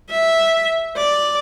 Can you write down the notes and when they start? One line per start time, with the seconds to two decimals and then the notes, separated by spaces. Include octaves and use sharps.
0.10 E5
0.97 D5